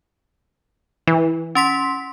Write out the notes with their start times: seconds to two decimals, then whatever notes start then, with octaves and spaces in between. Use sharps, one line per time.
1.07 E3
1.55 C#4 C6 B6